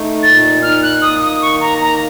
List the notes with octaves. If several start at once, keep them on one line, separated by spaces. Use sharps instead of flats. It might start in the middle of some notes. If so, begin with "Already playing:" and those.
Already playing: A3 D#4
A#2 A6
D#4 F6
F#6
A#3 D#6
D#6
D#3 C#6
A#5
A#3 A#5